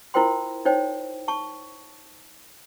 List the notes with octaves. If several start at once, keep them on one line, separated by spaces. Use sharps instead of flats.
E4 F4 A#4 C5 G5 C6
D#4 C5 C#5 G5
A5 C#6